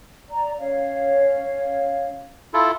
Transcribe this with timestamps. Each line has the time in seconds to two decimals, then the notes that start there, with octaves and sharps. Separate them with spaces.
0.30 D5 A#5
0.59 C#4 C#5 F5
2.54 E4 F4 A4